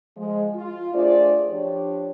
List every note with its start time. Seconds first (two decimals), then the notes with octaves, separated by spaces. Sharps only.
0.17 F3 G#3
0.55 F4
0.94 A3 D4 G#4 C5 D5
1.48 F3 D4 G4 C#5